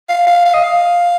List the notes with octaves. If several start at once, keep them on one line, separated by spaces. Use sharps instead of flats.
F5
F5
F5
D#5
F5